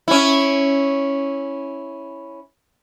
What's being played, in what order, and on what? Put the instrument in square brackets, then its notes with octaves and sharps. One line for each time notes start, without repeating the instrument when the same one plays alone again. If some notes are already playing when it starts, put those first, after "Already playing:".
[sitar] C#4 E4